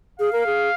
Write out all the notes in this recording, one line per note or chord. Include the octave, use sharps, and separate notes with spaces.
G#4 F5
A#4
G#4